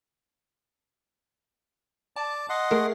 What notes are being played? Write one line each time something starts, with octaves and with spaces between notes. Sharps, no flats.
D5 A5
D#5 F#5 C6
A3 G#4 A#4